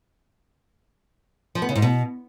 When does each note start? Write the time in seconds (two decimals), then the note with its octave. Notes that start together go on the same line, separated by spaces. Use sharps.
1.55 F3
1.62 B3
1.69 C#3
1.76 G#2
1.82 B2